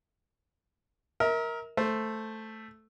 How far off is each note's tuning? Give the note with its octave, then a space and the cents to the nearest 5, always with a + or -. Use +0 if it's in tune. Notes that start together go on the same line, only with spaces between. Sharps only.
A#4 +5 E5 -40
A3 +0 C5 +0